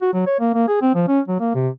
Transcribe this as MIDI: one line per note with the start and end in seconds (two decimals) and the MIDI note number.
0.02 0.09 66
0.13 0.25 54
0.27 0.36 73
0.40 0.53 58
0.54 0.65 58
0.68 0.80 68
0.82 0.94 60
0.95 1.05 53
1.08 1.20 61
1.28 1.40 54
1.40 1.54 58
1.55 1.69 48